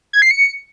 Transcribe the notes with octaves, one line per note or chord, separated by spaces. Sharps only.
G#6
C7
C#7